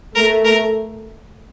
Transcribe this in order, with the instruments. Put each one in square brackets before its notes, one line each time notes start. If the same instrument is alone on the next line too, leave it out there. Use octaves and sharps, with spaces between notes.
[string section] A3 [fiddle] A#4
[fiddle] A#4